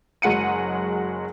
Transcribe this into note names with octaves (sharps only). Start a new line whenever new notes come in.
F#1 F#3 G#3 F#5 C#7 D#7